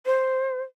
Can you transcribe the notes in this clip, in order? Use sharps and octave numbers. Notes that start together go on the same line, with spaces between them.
C5